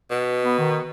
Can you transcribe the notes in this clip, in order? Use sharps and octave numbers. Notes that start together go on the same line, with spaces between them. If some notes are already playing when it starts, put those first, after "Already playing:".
B2
B3
D#3